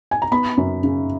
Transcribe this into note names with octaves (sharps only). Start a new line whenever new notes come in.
G#5
A#5
B3 B5
F#2
C#3